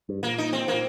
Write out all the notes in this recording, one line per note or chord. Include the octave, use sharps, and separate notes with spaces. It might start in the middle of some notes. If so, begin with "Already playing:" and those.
G2
A#2 A#3
D#4
C4
A#3
A#2